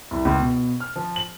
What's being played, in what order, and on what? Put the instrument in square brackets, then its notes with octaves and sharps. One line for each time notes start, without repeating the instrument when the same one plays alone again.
[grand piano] C2
C#2
B2
F6
F3
F#7